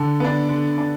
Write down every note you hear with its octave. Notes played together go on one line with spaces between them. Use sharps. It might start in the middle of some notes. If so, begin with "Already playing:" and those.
Already playing: D3 A4
B3 D4
D3
D4